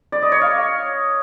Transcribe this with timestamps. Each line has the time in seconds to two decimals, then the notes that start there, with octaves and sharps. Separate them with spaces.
0.12 D5
0.22 D#5
0.32 C#5
0.42 F5